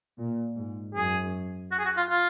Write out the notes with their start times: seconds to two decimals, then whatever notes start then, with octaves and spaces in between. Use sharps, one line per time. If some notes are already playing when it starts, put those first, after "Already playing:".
0.18 A#2
0.57 G#2
0.95 F#2 G#4
1.71 F#4
1.79 G#4
1.85 F#4
1.97 F4
2.10 F4